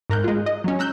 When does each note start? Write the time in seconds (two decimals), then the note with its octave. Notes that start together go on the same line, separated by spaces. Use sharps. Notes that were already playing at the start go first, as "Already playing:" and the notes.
0.10 G#2 A#4 F#6 G6
0.24 G#3 F4
0.46 D#5
0.64 F#3 C#4
0.79 A#5 E6 F#6 G6